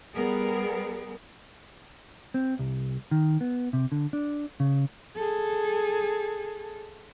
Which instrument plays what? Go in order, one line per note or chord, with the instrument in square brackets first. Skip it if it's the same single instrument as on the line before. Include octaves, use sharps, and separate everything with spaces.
[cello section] G3 B3 G#4 A#4
[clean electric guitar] C4
C2
D#3
B3
C3
D3
D4
C#3
[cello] G#4 A4